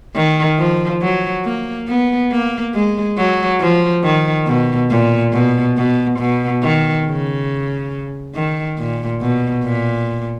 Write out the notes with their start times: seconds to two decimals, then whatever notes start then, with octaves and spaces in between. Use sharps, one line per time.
0.15 D#3
0.58 F3
1.01 F#3
1.44 A#3
1.88 B3
2.31 A#3
2.74 G#3
3.17 F#3
3.60 F3
4.03 D#3
4.46 B2
4.90 A#2
5.33 B2
5.77 B2
6.19 B2
6.63 D#3
7.06 C#3
8.35 D#3
8.78 A#2
9.22 B2
9.64 A#2